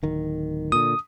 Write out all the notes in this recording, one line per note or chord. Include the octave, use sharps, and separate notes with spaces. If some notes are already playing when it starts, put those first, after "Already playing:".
D1 D#3
A#2 D3 D#6